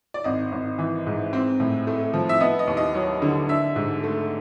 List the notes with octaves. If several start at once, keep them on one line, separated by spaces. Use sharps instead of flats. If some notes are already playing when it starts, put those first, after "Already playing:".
D5
G#1 D#5
G#1
E3
G#2
C4
A2
A3
F3
E5
B3 D#5
D#5
D#2
D#5
F#3
D3
D4 E5
G#2
A3